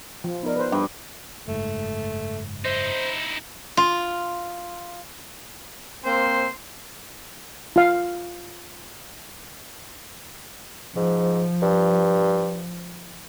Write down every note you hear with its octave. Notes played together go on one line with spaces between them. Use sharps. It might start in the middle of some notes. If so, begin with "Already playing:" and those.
F3
B3 D#4 A#4 D5
B4 C5
G2
F#1 G#2 A3
D#4 E4 C5
F4
A#3 C4 C5
F4 F5
G#2 F3
G2